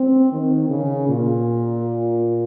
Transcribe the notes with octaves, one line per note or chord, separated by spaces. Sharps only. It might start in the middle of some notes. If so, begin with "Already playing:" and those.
Already playing: C4
D#3
C#3
A#2